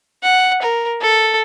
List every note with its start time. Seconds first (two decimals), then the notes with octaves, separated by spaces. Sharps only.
0.23 F#5
0.62 A#4
1.02 A4